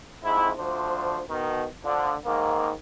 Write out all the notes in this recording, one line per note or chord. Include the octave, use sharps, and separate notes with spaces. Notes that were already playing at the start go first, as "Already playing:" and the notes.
F2 G#2 E4
D2 F3 D4 C5
B2 D#3
D3 F3
G#2 D#3 A#3